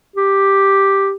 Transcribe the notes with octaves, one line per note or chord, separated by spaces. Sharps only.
G4